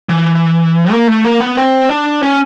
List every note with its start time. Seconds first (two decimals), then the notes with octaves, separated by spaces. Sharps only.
0.09 E3
0.91 A#3
1.07 A3
1.25 A#3
1.40 B3
1.57 C4
1.90 D4
2.23 C#4